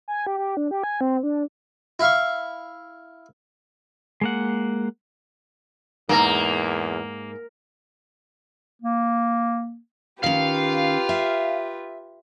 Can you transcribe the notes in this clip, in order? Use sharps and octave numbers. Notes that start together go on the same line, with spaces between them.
G#5
G4
G4
D4
G4
G#5
C4
D4
E4 F5 C#6
G#3 A#3 F#5
E2 G#2 A#3 A4 A#5
A#3
D#3 C#4 F4 G4 B4 F5
E5